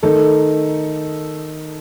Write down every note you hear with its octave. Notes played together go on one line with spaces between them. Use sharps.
D#3 A3 D#4 A4